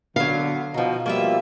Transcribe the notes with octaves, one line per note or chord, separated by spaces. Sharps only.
D3 F#3 B3 F5
B2 F3 D#4
B2 F3 G3 A#3 F4 E5